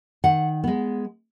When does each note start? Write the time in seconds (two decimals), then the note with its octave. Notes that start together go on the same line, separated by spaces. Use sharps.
0.24 D#3 F#5
0.64 G#3 B3